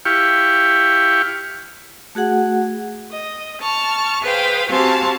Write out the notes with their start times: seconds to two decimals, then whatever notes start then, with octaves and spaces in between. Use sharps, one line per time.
0.05 E4 G4 F5 G5 C#6
2.15 A3 F#4 G#4 F#5
3.11 D#5
3.61 A5 C#6 F6
4.22 G#4 B4 C5 F5 G5
4.69 C4 F#4 G4 F5 G#5 A5